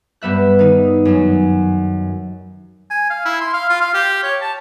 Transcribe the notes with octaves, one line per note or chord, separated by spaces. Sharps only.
G2 G3 B3 E5 F#6
D#3 D#4
F#2 F#3
G#5
F5
E4
C6
F5
F4
F5
G4
C#5
A5